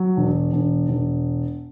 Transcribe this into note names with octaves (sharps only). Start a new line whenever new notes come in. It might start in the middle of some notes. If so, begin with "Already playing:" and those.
Already playing: F#3
E1
E1
E1